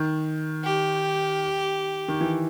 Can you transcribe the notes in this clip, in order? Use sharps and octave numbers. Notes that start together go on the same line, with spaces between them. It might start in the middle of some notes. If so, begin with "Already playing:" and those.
Already playing: D#3
G4
D#3
E3